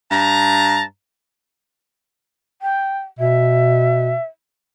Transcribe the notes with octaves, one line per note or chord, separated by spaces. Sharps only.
G2 A5 A#5
G5
B2 E5